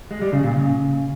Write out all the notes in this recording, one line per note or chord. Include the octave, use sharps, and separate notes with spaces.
G#3
G3
C#3
A#2
C#3